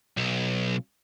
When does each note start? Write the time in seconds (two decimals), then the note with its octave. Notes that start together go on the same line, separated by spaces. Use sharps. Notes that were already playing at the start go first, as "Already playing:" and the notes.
0.17 B1